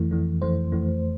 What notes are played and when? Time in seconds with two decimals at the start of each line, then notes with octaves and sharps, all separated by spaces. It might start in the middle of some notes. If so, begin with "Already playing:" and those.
Already playing: F2 E3 A3
0.11 F2 E3 A3
0.42 F2 E3 A3 C5
0.72 F2 E3 A3